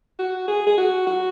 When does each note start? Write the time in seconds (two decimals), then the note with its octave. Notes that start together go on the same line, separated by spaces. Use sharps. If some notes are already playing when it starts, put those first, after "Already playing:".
0.19 F#4
0.48 G#4
0.67 G#4
0.78 F#4
1.07 F#4